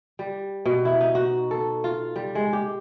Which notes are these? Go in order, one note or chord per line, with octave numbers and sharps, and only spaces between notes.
G3
B2
E4
D#4
F#4
A4
F4
G3
G#3
G4